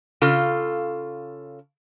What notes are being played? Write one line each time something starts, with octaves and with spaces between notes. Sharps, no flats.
C#3 F4 A4